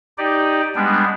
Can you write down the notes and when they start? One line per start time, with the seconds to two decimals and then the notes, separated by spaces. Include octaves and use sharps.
0.18 D#4 G4 D5
0.75 G3 G#3 B3 D4